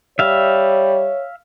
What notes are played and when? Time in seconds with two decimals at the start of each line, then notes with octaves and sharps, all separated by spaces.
0.19 G3 C#5 E5 F5